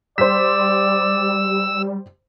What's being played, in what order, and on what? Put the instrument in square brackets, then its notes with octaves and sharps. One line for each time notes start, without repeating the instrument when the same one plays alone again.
[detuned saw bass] G3 [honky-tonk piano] C5 B6 [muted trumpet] D5 [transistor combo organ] E6